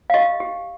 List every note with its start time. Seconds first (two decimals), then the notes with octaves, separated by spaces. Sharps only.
0.10 F5
0.14 G4 D#5
0.40 G4